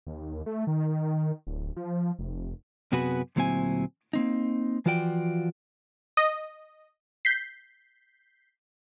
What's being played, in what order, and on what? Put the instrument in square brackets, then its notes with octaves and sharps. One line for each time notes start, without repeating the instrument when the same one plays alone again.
[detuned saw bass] D#2
A3
D#3
D1
F3
F1
[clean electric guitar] F#2 C3 B3 F#4 G#4 B4
D2 A#2 F#3 C4 E4 G#5
A#3 C4 D#4
E3 F3 F4 F#4 D5 G5
[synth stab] D#5
G6 B6 C7